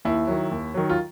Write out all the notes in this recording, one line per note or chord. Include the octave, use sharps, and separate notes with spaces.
D#2 E4
D#3 F#3
D#2
D#3 F#3
F4